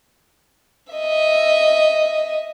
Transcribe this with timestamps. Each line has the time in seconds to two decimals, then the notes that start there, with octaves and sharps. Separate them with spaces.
0.93 D#5 E5